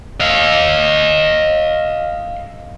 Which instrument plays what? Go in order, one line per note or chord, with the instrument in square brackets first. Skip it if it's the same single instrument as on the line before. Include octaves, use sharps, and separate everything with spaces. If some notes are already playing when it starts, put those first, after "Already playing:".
[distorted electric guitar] D#5 F5